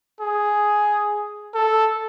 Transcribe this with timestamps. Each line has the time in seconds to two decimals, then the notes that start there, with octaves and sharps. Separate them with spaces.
0.20 G#4
1.54 A4